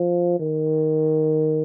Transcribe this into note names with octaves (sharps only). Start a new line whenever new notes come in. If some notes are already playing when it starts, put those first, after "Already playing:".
Already playing: F3
D#3